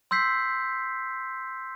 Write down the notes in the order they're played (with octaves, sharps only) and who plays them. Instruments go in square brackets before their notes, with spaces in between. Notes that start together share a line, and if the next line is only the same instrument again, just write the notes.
[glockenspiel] C6 E6 G6 B6 C7